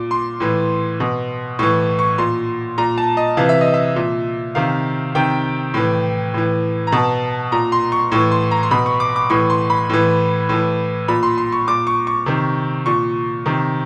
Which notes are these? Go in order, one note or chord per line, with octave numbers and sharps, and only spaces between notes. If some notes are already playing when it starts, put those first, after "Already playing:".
Already playing: A#2 D6
C6
A2 E3
B2
A2 E3 C#6
C#6
A#2 C6
A#2 A#5
A5
D#5
C3 E3 F5
E5
D#5
E5
A#2
C3 D#3 F5
C3 D#3 G5
A2 E3
A2 E3
A#5
B2 A5
A#2 A#5
C6
C#6
A2 E3 C#6
C6
A#5
C6
B2 B5
C#6
D6
D6
A2 E3 C#6
C6
B5
A2 E3
A2 E3
A#2 B5
C6
C6
C#6
A#2 D6
C#6
C#6
C3 D#3
A#2 C#6
C3 D#3